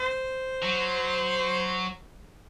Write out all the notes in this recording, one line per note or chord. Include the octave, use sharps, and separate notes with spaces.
C5
F#3